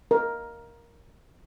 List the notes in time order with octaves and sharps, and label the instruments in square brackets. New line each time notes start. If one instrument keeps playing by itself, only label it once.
[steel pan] A#4